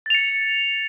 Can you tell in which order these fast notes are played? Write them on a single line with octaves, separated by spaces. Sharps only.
A6 F7 C#7